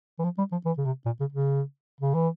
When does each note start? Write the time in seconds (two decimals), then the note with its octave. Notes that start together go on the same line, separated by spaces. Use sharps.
0.19 E3
0.24 F3
0.38 G3
0.52 F3
0.65 E3
0.77 C#3
0.85 C3
1.06 A#2
1.20 C#3
1.33 C#3
2.01 C#3
2.14 E3